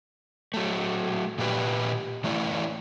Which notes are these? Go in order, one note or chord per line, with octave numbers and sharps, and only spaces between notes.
F#3 A3
A#2 G4 B4
E3 A3 C#4 E4 D5